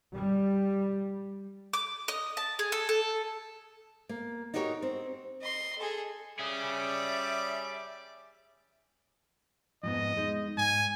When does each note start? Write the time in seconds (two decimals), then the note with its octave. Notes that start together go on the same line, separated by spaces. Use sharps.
0.15 G3
1.73 D6
2.08 D#5
2.37 A5
2.59 G#4
2.72 A4
2.89 A4
4.09 A#3
4.54 D#4 F#4 G4 A#4 C#5
4.82 C4
5.42 D#5 C6
5.78 G#4 A4
6.39 G3 C#4 G#4 D5 E5 D6
9.83 F2 G#2 B3 D#5
10.17 G#3 D#4
10.58 G#2 G#5